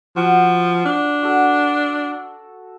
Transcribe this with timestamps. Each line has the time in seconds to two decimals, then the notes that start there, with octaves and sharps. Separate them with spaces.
0.16 F3 F#4
0.85 D4
1.22 F#4 A4